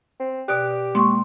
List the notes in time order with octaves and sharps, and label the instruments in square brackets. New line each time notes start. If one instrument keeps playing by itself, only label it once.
[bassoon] C4
[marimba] B2 D5 F#6 [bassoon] G4
[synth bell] G#3 A#3 [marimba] C6 C#6